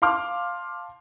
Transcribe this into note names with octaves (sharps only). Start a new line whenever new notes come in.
F5 A5 C6 D6 F6